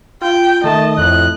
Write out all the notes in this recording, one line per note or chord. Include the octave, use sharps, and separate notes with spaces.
F4 G5
D#3 A3 D#5 A5
F2 A2 F#6